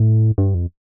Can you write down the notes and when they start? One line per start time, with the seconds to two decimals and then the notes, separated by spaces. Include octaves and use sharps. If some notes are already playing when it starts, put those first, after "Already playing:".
Already playing: A2
0.38 G2
0.54 F2